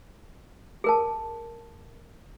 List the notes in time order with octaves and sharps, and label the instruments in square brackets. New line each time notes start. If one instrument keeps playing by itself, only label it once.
[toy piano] G#4 A#4 A5